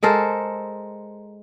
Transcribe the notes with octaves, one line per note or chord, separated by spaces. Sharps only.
G#3 A4 A#4 C5